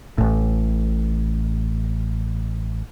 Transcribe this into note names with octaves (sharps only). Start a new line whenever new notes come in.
A1 A2